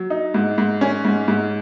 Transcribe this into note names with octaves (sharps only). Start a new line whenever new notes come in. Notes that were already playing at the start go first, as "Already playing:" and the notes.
Already playing: F#3
D#4
G#2
G#2
C#4
G#2
G#2